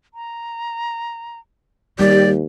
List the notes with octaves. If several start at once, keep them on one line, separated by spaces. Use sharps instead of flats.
A#5
D#2 G3 G4 D5